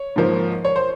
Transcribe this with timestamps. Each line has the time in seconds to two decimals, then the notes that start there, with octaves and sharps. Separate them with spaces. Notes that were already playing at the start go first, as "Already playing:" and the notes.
Already playing: C#5
0.16 G#2 F3 A#3
0.65 C#5
0.76 C5